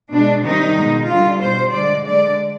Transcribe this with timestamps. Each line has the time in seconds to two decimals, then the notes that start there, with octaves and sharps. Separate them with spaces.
0.12 B2 G#3 D4
0.44 C3 D#3 G3 D#4
0.76 B2 G#3
1.09 D3 G3 F4
1.41 B2 G3 C5
1.74 D3 G#3 D5
2.06 D3 G#3 D5